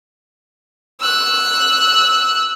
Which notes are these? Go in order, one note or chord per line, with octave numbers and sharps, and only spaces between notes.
E6 F#6